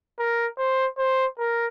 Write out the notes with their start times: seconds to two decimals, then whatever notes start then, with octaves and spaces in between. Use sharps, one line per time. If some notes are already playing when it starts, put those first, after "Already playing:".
0.19 A#4
0.58 C5
0.98 C5
1.39 A#4